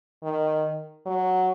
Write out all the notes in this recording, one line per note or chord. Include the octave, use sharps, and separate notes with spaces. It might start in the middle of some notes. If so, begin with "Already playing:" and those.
D#3
F#3